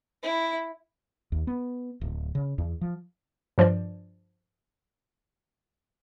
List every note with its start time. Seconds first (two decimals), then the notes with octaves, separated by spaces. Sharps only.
0.23 E4
1.32 D#2
1.47 B3
2.01 D1
2.35 C#3
2.58 E2
2.81 F3
3.58 G2 F3 C5 D5